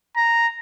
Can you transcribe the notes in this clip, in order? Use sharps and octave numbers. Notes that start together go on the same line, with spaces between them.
A#5